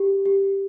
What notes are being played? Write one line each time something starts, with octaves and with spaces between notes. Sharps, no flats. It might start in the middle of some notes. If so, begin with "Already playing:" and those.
Already playing: G4
G4